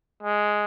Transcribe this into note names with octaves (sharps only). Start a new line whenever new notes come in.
G#3